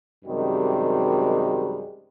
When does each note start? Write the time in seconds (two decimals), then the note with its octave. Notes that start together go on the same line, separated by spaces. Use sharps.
0.25 F#2 C3 D#3 G3 G#3 F#4